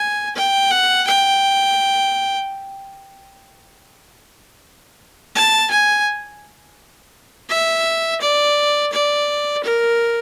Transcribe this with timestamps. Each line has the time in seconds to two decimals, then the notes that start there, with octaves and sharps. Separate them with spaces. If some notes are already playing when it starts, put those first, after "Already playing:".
Already playing: G#5
0.36 G5
0.71 F#5
1.07 G5
5.35 A5
5.71 G#5
7.50 E5
8.21 D5
8.92 D5
9.64 A#4